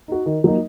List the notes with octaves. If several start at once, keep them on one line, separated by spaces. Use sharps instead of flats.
D#4 F#4
D#3
F#3 A#3 D#4